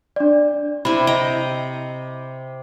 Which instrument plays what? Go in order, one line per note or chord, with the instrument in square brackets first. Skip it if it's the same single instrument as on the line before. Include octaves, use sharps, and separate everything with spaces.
[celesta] D4 D5
[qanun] C3 E4 [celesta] B5
[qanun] D#5 G5 A#5